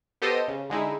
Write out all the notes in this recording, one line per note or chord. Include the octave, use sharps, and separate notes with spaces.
B3 G4 A4 C5 D#5
C#3
D3 G#3 D#4 E4